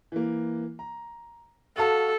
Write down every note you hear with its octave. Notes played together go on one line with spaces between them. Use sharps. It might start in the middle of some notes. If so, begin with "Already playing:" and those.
E3 A#3
A#5
F#4 A4 F5 A5